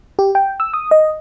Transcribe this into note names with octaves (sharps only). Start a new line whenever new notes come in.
G4
G5
E6
D#6
D#5